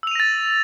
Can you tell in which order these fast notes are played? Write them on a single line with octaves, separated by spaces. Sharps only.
E6 F7 D#7 A#6 A6